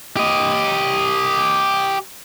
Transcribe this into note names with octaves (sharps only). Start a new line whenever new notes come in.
G4 D#5